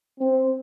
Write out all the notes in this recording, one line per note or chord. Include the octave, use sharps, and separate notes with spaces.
C4